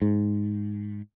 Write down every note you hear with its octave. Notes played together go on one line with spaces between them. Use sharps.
G#2